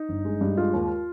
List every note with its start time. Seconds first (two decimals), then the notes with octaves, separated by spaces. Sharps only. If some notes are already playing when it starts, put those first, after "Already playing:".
Already playing: D#4
0.09 G1
0.25 G#3
0.41 G2
0.57 G#3 F4
0.73 D#2